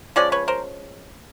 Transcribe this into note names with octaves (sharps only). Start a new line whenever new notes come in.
F3 G#3 C#4 D5
B4 C#5
A#4 C5